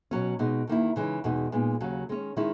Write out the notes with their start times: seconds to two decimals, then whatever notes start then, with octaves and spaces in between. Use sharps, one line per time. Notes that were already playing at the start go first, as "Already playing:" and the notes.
0.11 B2 F#3 C#4
0.39 B2 G#3 D#4
0.67 E2 D#3 A#3 E4
0.96 C#3 E3 G#3 D#4
1.24 E2 B2 G#3 D#4
1.52 A#2 G#3 B3 D#4
1.80 D#2 C#3 F#3 C#4
2.09 D#3 G#3 C#4
2.37 D#3 G#3 C#4 E4